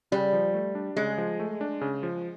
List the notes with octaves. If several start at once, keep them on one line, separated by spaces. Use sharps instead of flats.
C#3 G3
F3
A3
D4
C#3 G#3
F3
A3
D4
C#3
F3